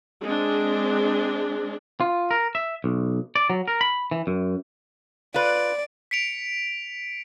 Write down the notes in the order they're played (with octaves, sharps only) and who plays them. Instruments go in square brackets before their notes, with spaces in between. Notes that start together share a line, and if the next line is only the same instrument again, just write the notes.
[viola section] G#3 C4 D4
[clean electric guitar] F4
A#4
E5
B1
D5
F#3
A#4
B5
E3
F#2
[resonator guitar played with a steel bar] F4 B4 [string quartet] D5
[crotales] B6 C#7 D7 F7